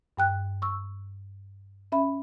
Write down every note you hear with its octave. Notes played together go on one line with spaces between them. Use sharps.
G2 G5 F#6
C#6 E6
C#4 E5 B5